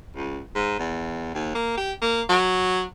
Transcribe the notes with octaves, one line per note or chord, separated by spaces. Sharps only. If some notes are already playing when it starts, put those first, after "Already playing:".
C#2
G#2
E2
D#2
A#3
G4
A#3
F#3